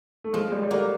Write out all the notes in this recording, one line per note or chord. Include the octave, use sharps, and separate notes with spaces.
A3
F3 G#3
G#3
G3
G3
F#3 A#3